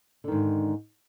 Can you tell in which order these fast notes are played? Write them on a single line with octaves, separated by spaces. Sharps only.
D3 D#3 G#2